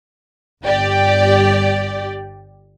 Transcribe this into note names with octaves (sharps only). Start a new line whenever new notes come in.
G1 G4 D5